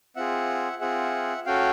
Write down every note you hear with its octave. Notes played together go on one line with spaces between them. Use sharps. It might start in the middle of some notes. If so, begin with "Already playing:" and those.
C4 F4 G#4 E5 F#5
C4 F4 G#4 E5 F#5
C#4 F#4 A4 F5 G5